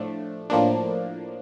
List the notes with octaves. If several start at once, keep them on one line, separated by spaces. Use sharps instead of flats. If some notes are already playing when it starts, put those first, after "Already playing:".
Already playing: A2 F3 A3 D4
A2 F3 A#3 D4